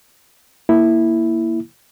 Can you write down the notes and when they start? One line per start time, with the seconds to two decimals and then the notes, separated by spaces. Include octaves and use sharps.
0.69 A#3 E4